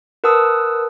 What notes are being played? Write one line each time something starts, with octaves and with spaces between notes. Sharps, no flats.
A#4 B4 F#5 A5 D#6 E6